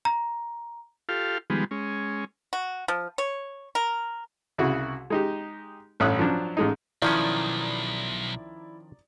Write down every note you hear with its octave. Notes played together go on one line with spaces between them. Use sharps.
A#5
F4 G4 A4 F5
D#3 F3 G3 G#3 B3
G#3 C#4
F#4
F3
C#5
A#4
C2 C#3 E4 F#4
G#3 D#4 G4
A1 G2 C#5 E5 D#6 F#6
F3 F#3 D4
A1 G#3 D#4
B1 D#3 F3 C#4 E4 D5 A#5 D#6